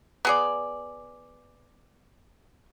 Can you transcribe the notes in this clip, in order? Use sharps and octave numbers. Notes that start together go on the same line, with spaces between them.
B3 G#4 D5